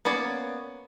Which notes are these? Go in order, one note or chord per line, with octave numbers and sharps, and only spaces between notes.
A#3 B3 C#4 C#5 D5